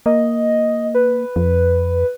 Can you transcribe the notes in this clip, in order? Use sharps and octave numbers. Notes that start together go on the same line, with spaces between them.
A#3 D#5
B4
F2